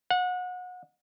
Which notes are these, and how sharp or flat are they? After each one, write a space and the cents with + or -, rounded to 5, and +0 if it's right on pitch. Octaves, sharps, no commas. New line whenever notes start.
F#5 -30